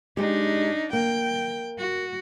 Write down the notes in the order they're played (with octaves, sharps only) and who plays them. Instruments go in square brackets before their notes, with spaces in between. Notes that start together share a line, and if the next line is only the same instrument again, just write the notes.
[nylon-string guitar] G#3 G4 [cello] D4 D#4
[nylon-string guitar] A#3 [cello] G5
[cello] F#4